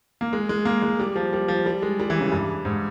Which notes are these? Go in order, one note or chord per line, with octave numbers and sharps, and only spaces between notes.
A#3
G#3
G#3
A#3
G#3
G3
F3
G3
F3
G3
G#3
G3
E3
C#3
G2
G#2